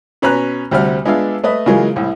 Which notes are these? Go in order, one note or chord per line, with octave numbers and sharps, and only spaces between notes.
B2 C#4 B4 A#5 F#6
D2 C3 G3 C4 F#5 F6
G#3 B3 D4 F4 E5 F5
A3 B4 D#5
C#3 E3 F#3 G#3 A#3 F4
C2 A2